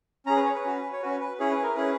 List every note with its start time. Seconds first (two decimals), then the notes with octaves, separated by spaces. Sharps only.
0.26 C#4 A#5
0.30 G#4
0.36 B4
0.45 C#5
0.55 B4
0.65 C#4 F#4
0.93 C#5
1.02 C#4 F#4 B4
1.20 B4
1.39 C#4 E4 G#4 C#5
1.51 B4
1.63 A#4
1.75 C#4 E4 G#4 B4